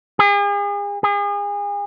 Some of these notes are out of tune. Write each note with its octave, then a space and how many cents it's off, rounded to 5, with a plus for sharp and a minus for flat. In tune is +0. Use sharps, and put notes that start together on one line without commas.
G#4 -40
G#4 -35